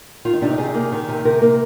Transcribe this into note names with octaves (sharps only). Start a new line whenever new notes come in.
D#3 F4
D#4
C3 D4
D#4
C3 G#4
A#3
D#3
C3
C3 A#4
A#3 A#4